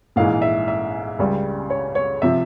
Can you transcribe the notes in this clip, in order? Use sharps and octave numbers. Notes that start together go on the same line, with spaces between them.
A#1 G#2 E3 G#3 F5
E5
E5
C#2 C#3 G3
C#5
C#5
C3 F3 E5